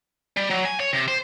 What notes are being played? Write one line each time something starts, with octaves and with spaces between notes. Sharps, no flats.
G3
F#3
G#5
C#5
C3
C5